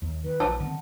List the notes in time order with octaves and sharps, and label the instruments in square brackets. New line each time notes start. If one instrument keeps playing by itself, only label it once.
[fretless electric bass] D#2
[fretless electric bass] D#3 [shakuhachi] B4
[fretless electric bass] A#1 [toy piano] A5
[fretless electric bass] D3 D#3 C4 [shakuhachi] F#5